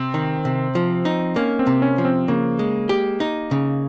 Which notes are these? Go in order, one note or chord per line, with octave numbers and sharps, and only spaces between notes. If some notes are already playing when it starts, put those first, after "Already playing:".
Already playing: C3 C4
D#3
C3
F3
D#4
A#3 C#4
C4
C3
C#4
F3
C4
C#3 A#3
G#3
G4
D#4
C#3